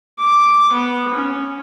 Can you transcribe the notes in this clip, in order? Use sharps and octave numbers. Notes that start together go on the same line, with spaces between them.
D6
B3
C#4